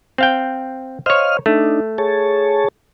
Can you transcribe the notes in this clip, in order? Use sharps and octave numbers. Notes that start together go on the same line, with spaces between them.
C4 F5 G5
C5 C#5 D#5 F5 F6
A3 D4 D#4
G#4 C#5 A5